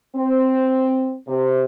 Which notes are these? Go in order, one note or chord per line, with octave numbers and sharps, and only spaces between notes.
C4
C3